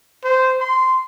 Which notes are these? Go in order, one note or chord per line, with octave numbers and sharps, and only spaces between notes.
C5
C6